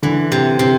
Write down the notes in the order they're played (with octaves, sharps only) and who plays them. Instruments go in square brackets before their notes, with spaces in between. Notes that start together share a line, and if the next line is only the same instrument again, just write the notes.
[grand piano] D3 [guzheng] E3
[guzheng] C3
C3